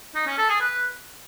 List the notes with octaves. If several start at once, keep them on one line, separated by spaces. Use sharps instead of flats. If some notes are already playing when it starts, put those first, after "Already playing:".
D#4
C#4
A4
G#4
B4